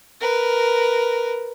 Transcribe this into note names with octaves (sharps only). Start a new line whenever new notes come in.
A#4 B4